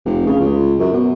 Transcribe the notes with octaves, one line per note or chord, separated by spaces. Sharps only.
F1
C#3
C#2
F#2
B2